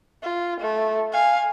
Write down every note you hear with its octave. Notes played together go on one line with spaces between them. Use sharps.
F4
A3
F5 G#5